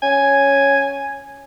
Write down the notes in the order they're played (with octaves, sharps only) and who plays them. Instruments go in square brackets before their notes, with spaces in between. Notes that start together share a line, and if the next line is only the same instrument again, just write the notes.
[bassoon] C#4 [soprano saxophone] G#5